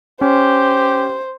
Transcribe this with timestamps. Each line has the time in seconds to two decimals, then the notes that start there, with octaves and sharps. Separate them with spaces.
0.21 C#4 G4 C5